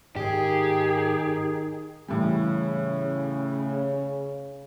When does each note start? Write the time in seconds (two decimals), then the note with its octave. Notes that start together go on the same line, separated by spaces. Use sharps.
0.16 G#2 D#3 G4 G#4
2.08 A2 C#3 E3 G3